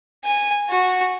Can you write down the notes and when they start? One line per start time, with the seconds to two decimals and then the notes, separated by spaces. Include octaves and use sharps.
0.25 G#5
0.70 F#4